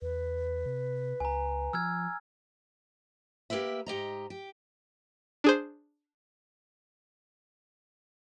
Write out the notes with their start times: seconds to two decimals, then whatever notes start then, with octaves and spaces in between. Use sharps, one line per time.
0.02 E2 B4
0.66 C3
1.20 C#2 G#5 A#5
1.73 F3 E6 F6 G#6
3.50 A#3 G4 A#4 B4 E5
3.86 G#2 G4 D#5 A#5
4.30 G4
5.44 D4 G#4 C5